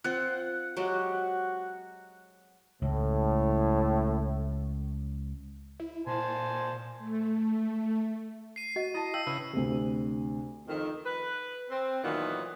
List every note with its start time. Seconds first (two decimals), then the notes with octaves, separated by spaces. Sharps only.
0.04 C4 F4 F#5
0.77 F#3 G#3 F#4 G4
2.82 C#2 A2
5.80 E4
6.07 A#2 C5 G#5 A5
6.98 A3
8.56 C7 D#7
8.76 F#4 D#5
8.94 E4 D#5 A5
9.14 F5 G5 E6
9.27 C#3 E4 B4
9.53 D2 C3
10.68 F2 D#3
11.05 B4
11.70 C4
12.04 A#2 D#3 E3 F#3 B3